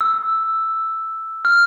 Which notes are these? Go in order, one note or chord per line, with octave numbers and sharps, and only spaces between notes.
E6
F6